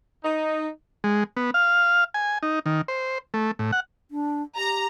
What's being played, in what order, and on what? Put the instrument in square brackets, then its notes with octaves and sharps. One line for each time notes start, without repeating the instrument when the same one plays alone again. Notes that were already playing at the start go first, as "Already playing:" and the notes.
[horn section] D#4
[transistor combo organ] G#3
B3
F5
G#5
D#4
D#3
C5
A3
A2
F#5
[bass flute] D4
[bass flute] G4 [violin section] A#5